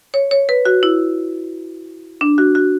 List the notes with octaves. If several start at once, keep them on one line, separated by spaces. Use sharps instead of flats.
C#5
C#5
B4
F#4
E4
D4
F#4
F#4